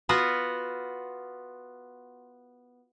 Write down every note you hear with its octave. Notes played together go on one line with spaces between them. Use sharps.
B3 F4 F#4 F#5